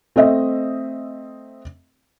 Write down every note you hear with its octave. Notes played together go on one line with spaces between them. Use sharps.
A3 C4 D#5 E5